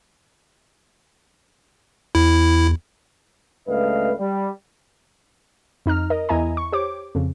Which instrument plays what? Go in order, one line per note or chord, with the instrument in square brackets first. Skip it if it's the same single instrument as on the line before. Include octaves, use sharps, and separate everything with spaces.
[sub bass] E2 [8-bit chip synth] E4
[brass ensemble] C#2 G2 A3 B4 D#5 F5
G3
[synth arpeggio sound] F2 D#4 A#5 F6
A#4 D#5
E2 E4 D#5 G#5 A#5
C#6
G4 C5 C#5 D6
F2 C#3